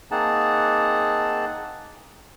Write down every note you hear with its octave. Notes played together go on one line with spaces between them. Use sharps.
A#3 C4 D#4 G#4 F#5 A5